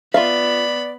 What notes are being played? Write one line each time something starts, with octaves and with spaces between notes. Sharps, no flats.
B3 F4 D5 E5 F5 B5